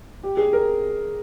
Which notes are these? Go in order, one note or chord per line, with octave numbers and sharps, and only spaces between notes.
G4
G#4
A#4